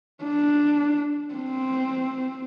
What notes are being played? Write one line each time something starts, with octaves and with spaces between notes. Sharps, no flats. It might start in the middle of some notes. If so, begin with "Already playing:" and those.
D4
C4